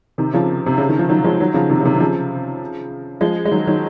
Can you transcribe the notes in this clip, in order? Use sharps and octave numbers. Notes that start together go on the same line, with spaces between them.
C3 D#3
C#3 F3
C3
C#3
D#3
F3
D#3 F#3
F3 G#3
D#3 F#3
C#3 F3
C3 D#3
C#3
C3 D#3
D#3
C#3 F3
F3 G#3
G#3
D#3 F#3
D#3 F#3